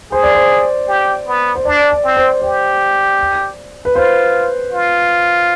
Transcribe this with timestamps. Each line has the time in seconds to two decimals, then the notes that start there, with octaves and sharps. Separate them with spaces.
0.12 G#4 C5
0.23 D5
0.35 C5
0.89 G4
1.27 B3
1.55 C5
1.65 D4 D5
1.91 D5
2.04 C4
2.17 C5
2.42 G4 D5
3.85 B4
3.96 F4 C5
4.72 F4